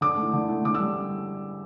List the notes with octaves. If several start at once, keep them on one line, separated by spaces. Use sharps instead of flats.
D3 D6
A3
E4
D3
A3 E4
D3 D6
E6
G3